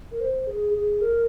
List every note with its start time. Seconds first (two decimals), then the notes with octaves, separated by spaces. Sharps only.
0.11 A#4
0.20 C5
0.47 G#4
0.74 G#4
1.01 A#4